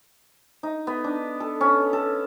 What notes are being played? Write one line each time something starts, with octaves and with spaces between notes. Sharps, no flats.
D#4
B3
D4
A4
C#4
A4